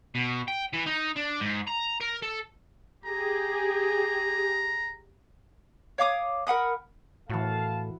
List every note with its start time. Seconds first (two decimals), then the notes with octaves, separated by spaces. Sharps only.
0.15 B2
0.48 G5
0.73 E3
0.86 D#4
1.16 D4
1.41 G#2
1.68 A#5
2.01 A#4
2.22 A4
3.05 G4 G#4 A#5
5.98 C#5 F5 D6 D#6
6.47 A#4 F#5 B5 D#6
7.30 A2 E3 F#4 A4 F5 A5